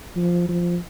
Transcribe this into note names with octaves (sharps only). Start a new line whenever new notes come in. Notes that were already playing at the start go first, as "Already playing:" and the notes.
F3
F3